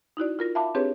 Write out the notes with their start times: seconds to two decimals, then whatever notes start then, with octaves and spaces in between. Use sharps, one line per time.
0.17 D#4 E4 F#4 D5
0.39 F4 A#4 A#6
0.55 E5 F5 A5 B5 D6
0.75 C4 D4 G4 G#4 B4 C#5